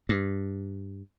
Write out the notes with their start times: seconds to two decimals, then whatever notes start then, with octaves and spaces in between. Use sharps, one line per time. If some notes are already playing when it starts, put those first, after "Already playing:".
0.09 G2